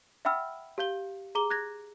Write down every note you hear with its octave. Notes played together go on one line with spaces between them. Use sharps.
E5 F#5 G5 B5 E6 F6
G4 F5 G6 G7
G#4 A#5 D6 G7
F#6 G#6 A#6